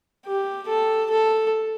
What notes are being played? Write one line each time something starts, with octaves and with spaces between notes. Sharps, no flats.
G4
A4
A4